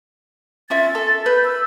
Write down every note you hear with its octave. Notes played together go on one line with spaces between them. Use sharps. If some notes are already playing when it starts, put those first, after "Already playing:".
C#4 F4 E5 A6
A4
B4 G6
E6